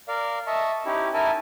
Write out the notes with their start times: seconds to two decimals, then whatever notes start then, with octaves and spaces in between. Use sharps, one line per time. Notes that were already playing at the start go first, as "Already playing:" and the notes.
0.08 A#4 D5 F5
0.47 D#5 E5 A5 C#6
0.86 C#4 D#4 E4 G4
1.14 D#4 E4 A#4 E5 G#5 A5